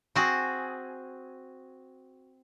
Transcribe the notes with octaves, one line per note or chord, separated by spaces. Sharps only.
C4 F#4 G#4